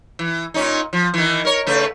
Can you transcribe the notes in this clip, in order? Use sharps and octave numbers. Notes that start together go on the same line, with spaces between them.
E3
A#2 C#4 D#4
F3
D#3 E3
A#4 C#5
C#3 A3 B4